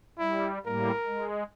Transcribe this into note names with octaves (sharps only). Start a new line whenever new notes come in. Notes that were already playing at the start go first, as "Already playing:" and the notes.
G3 E4
A2 G3 A#3 A#4
G#3